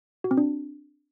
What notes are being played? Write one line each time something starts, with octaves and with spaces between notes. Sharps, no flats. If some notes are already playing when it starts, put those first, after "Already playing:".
F#4
C4
D4